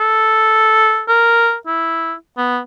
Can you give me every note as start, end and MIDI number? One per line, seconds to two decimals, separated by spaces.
0.01 1.03 69
1.09 1.55 70
1.67 2.14 64
2.38 2.59 59